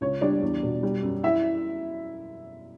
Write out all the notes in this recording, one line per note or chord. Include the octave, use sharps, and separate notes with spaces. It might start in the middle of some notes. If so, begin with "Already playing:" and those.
C#2 C#5
G3 D4 D5
E2
B2
G3
F#2
E4 E5